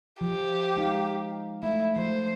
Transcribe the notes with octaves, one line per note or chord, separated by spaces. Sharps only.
F3 G4
G#3 D#4 F5
A3 E4
F3 A3 C5